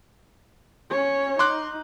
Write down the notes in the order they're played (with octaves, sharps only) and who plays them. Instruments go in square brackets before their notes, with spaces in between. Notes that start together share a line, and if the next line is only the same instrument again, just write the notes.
[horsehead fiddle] C#4 C#5
[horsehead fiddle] D#4 [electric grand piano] C6 D6 F#6